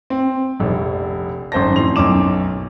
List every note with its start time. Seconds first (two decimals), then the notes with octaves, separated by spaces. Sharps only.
0.10 C4
0.60 F1 A#1
1.52 G#1 F#2 C5 A5 A#6
1.76 F2 A2 C6 F7
1.96 B1 F#2 C#4 D6 E7